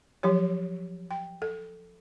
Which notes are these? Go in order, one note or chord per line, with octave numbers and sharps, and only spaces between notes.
F3 F#3 G4 C#5
G5
A4